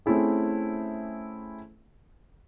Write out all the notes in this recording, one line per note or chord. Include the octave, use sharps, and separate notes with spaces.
A3 C4 C#4 E4 G#4